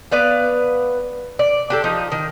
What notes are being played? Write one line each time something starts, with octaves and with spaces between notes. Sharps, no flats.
B3 B4 D5 F5
D5
D4 G4 A4
F3 D#4
D#3